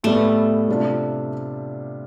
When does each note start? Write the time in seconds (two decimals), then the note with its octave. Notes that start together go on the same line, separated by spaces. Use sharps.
0.04 A2 G3 A3 B3
0.68 C3 G3 D4 F4